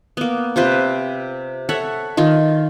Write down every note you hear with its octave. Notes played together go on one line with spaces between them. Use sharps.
A#3 B3
C3 F4 B4 C5
A4 C#5 E5 F#5
D#3 F4